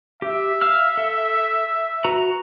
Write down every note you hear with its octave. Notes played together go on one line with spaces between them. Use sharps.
G4 E5
F5 E6 F6
A4
F#4 B4 A#5